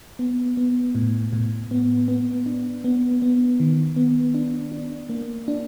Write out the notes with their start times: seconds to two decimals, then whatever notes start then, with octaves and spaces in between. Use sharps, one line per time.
0.19 B3
0.57 B3
0.95 A2
1.33 A2
1.71 B3
2.08 B3
2.46 D4
2.84 B3
3.22 B3
3.60 D#3
3.96 B3
4.34 D4
4.72 D4
5.09 A#3
5.48 D4